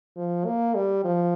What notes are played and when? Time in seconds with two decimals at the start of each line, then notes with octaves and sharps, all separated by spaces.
0.17 F3
0.45 A#3
0.75 G3
1.04 F3